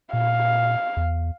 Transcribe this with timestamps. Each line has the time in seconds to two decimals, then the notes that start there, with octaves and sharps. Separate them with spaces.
0.13 A#2 F5
0.97 E2